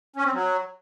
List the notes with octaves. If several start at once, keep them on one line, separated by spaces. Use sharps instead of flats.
C#4
C4
F#3